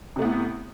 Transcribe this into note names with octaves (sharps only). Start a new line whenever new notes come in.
A2 C3 A3 B3